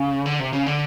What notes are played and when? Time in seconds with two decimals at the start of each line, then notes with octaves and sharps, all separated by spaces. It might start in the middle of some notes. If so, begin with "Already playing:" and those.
Already playing: C#3
0.26 D3
0.40 C3
0.53 C#3
0.66 D3